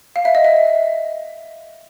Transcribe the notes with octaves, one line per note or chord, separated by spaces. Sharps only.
F5
E5
D#5
E5